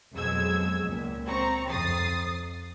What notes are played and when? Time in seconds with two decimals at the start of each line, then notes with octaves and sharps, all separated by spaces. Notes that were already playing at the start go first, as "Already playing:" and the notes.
0.13 F2 B2 F#3 G#3 E6 G#6
0.87 C#2 A#2
1.26 C4 A#5 C#6
1.70 F2 D#6 A6 C7